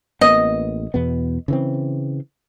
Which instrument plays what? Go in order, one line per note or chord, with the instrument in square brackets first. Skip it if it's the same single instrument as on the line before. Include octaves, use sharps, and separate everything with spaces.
[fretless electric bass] A1 A#3 B3 [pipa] D#5
[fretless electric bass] E2 B2 B3
C#3 E3 C4